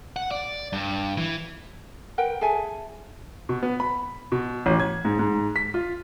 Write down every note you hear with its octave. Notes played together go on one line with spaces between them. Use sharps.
F#5
D5
G2
E3
A#4 B4 F#5 G5
G#4 A4 E5 G#5
B2
B3
B5
B2
A1
G#6
G#2
G#2
B6
F4